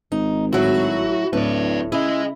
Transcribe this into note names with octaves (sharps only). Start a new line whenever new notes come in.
G#1 D#4
A2 F#3 E4 F#4
D1 A2 B4 D5
C#3 E4 G#4 D#5